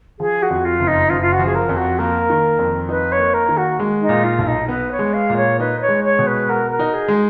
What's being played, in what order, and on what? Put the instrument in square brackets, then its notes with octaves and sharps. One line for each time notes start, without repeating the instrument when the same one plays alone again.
[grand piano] F3 [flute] G#4
[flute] F#4
[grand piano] F2
[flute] F4
[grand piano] F#1
[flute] D#4
[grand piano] F#1 [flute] F4
[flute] F4
F#4
[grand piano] F3
[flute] G#4
A#4
[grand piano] F2
[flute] F#4
[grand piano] A#3 [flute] A#4
[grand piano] D#3
F2
[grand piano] D#4 [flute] B4
[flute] C#5
[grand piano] A#3
[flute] A#4
[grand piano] D#3
[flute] F#4
[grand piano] G#3
[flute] D#4
[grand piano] A#2
[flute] F4
[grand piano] B1
[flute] D#4
[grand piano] B3 [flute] B4
[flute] C#5
[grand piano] G#3
[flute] F5
[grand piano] A#2
[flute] C#5
[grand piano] D#4 [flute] B4
[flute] C#5
[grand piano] G#3
[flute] C#5
[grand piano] B2
[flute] B4
[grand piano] F#4 [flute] A#4
[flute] A#4
[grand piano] D#4
[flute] G#4
[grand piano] G#3